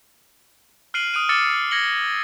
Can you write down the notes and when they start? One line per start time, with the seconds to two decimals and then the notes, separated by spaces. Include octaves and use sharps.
0.94 F6 F#6 C7 D7 D#7 F#7
1.14 D#6 F#6 D7 D#7
1.29 D6 E6 F6 A6 C#7
1.71 G#6 A#6 C#7 F#7 G7